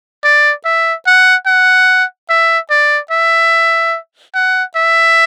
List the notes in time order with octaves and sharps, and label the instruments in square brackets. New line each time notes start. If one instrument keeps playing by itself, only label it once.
[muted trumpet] D5
E5
F#5
F#5
E5
D5
E5
F#5
E5